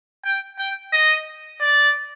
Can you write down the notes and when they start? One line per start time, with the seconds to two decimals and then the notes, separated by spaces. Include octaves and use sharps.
0.25 G5
0.59 G5
0.93 D#5
1.60 D5